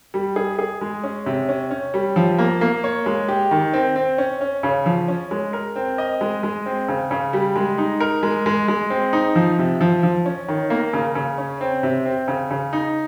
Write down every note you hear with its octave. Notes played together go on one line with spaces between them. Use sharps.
G3
G#4
G#4
G#3
C#4
C3
C#4
C#4
G3
F3
A#3
A#3
C#5
G#3
G4
D#3
C4
C4
C#4
C#4
C#3
F3
C#4
G#3
A#4
C4
D#5
G#3
G#3
C4
C#3
C#3
G3
G#3
D#4
A#4
G#3
G#3
G#3
C4
D#4
F3
C3
F3
F3
C#4
D#3
A#3
C#3
C#3
C#4
C4
C3
C4
C#3
C#3
D#4